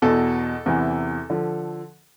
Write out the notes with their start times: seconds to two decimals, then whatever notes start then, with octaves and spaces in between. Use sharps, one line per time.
0.02 E2 B2 A4
0.66 E2 C3 E3
1.30 D3 F3